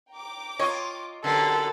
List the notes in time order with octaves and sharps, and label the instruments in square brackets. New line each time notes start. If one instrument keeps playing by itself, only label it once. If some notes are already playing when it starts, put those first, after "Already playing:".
[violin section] G5 A#5 D6
[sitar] F4 D#5 [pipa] C#5
[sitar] F#2 D3 E3 [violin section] G4 A#4 A6 [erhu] A4